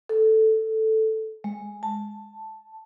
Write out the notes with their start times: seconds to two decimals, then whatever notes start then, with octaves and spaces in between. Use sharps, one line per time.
0.09 A4
1.44 G#3
1.83 A5